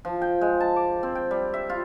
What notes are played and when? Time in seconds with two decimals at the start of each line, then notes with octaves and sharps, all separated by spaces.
0.05 F3
0.22 G5
0.41 G#3
0.60 A5
0.76 D6
1.03 C4
1.15 G5
1.31 G3
1.54 E5
1.69 F4